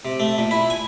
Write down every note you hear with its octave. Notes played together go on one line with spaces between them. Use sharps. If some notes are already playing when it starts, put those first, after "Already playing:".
C3
A3
A#2
E4
G#5